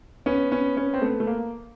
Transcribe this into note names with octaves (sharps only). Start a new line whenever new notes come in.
B3 C#4
B3 C#4
B3 C#4
C4
A3 B3
A3
A#3